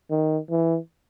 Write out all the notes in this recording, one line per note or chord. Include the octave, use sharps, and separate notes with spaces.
D#3
E3